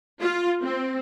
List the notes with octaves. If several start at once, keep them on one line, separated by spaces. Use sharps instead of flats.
F4
C4